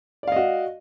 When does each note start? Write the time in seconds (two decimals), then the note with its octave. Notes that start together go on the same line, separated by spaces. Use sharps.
0.23 D5
0.28 F5
0.32 D#5
0.36 F#4